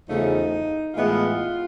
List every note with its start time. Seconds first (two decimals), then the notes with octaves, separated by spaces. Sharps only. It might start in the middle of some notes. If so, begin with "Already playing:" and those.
0.08 E2 C#3 F3 A3 D#4
0.94 A2 E3 G#3 B3 F4